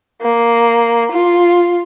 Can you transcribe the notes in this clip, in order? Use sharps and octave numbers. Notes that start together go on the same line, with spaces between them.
A#3
F4